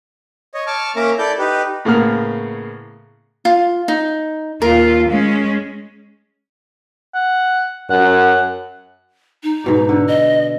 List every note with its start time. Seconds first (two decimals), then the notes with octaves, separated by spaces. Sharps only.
0.54 C#5 D#5
0.67 A5 C#6 D6 F6
0.96 A#3 C#4 A#4 E5 A#5 D6
1.19 E4 A4 D5 D6 G6
1.39 D#4 G4 B4
1.85 A2 C#3 A#3 B3 G#4 F6
3.45 F4
3.88 D#4
4.62 D#2 F4 A#4
5.09 G#3 C#4
7.14 F#5
7.90 F#2 F#5
9.43 D#4
9.64 G#2 B2 D5
9.89 D3
10.08 D#5